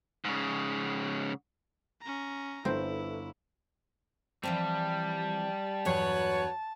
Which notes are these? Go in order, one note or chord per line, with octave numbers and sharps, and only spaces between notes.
G#2 C#3
C#4 A#5
G1 C4 E4 A4 B4 E5
E3 F3 G3 C4 A5
E2 G2 F#3 F#4 B4 C#5